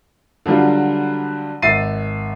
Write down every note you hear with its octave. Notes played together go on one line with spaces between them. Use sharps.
D3 F#3 G3 F4
G#1 E5 A6 C7 D#7